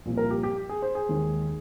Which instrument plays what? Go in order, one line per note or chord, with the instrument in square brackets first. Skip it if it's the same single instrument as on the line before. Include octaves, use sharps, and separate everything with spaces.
[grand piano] C2 A#2 F3
A#4
G4
G4
G#4
C5
G#4
D#2 D#3 G#3